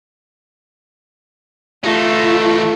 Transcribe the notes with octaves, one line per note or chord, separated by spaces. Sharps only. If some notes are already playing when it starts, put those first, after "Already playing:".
E3 A3 D#4 F4